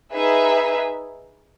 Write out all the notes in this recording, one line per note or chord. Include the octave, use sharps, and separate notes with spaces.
D#4 G#4 B4 E5